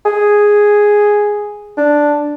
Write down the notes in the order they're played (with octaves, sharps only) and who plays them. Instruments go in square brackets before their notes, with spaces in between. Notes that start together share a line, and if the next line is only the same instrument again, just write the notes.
[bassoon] G#4
D4